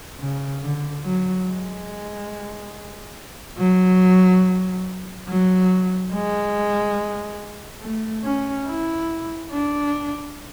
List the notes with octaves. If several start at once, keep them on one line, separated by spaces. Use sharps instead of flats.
C#3
D3
F#3
G#3
F#3
F#3
G#3
A3
C#4
E4
D4